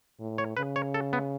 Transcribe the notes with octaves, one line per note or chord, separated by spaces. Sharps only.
A2
C#5
C#3 B4
C#5
A4
B3